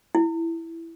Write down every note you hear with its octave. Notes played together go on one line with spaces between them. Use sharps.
E4